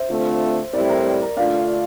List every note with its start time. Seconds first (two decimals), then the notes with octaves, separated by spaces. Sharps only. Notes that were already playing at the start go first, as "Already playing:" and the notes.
Already playing: C5 E5
0.09 D3 A3 C4 F4
0.73 A2 G3 C4 E4 G4 A#4 D5
0.89 A#4
1.22 A#4
1.37 D3 A3 D4 F4 D5 F5